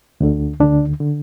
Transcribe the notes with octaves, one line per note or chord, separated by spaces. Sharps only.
D2 D3
D2 D3 D4
D3